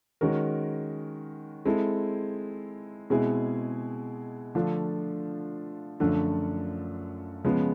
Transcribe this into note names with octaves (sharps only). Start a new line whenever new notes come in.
D#3 G#3 C#4 F#4 A#4
G#3 C4 E4 A4
B2 G#3 C4 E4 G#4
D3 F3 A3 D4 F4
F#2 D3 F3 A3 D4
C#3 F3 G#3 B3